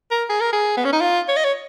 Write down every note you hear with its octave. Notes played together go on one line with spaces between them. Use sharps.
A#4
G#4
A#4
G#4
B3
C#4
D#4
F4
C#5
D#5
C#5